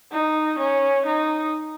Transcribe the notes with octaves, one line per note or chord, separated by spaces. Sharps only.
D#4
C#4
D#4